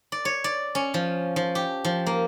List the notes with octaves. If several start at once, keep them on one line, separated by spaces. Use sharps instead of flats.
D5
C#5
D5
C#4
F3
F3
G4
F3
A#3